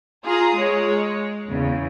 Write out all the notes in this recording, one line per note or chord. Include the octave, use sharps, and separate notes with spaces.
F4 G#4 A#5 D#6
G#3 C#5
E2 C#3